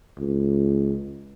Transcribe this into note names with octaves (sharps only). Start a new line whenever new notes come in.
C#2